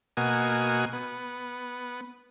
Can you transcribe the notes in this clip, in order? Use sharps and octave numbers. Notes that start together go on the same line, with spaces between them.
B2 A#3 F#4 D#5 G#5
B3